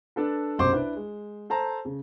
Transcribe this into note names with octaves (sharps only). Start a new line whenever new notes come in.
D4 A4 B4
B1 F#2 C3 C5 C6 D6
D4 E4 B4
G#3
A4 C5 A5 A#5
C#3